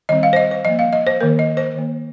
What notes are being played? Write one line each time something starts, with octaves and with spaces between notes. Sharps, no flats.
D#3 G3 C4 D#5
F5
C5
D#5
C5
F3 A#3 D#5
F5
D#5
C5
D#3 A#3 A#4
D#5
C5
D#3 A#3